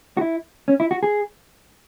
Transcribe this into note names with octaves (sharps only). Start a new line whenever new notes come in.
F#4
E4
C#4
E4
F#4
G#4